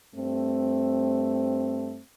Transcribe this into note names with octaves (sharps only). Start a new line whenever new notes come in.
G2 A3 C4